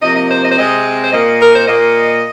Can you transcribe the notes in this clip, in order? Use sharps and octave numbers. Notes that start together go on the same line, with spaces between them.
C3 F3 A#3 D#5
D#5
C5
D#5
C5
C3 G#3 C4 D#5
C5
A#2 A#3 D#5
A#4
C5
A#2 A#3 D#5